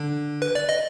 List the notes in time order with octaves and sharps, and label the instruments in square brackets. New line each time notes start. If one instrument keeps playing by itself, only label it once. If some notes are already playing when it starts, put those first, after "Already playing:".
Already playing: [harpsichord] D3
[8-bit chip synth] B4
D5
D#5